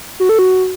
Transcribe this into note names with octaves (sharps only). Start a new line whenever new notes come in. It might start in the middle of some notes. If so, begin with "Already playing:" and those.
F#4
A4
F#4